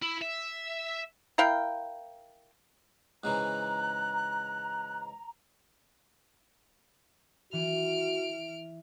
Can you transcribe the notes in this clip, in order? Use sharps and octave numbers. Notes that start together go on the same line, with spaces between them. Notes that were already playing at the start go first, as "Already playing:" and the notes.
E4
E5
E4 A#4 F5 G5
G#2 C#3 E3 A#5 F#6
E3 F#4 F6 D7